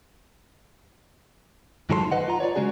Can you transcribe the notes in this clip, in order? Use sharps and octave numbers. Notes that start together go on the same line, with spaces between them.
G#2 D#3 F#3 A4 B4 C6
B4 D#5 F#5
F4 A#5
C#5 D5
C#3 G#3 C#4 F#4 G#4